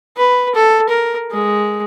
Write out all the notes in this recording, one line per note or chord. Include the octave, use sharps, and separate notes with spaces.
B4
A4
A#4
G#3